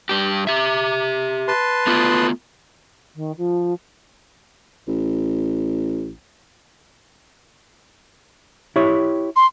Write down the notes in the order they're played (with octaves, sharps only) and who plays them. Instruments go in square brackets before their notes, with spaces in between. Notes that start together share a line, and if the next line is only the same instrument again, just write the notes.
[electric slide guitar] G2 G4
G4 E5
[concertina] B4 A5 C6
[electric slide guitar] A3 B3 F4
[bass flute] D#3
F3
[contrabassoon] A1
[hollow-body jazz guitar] E4 G4 C#5
[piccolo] C6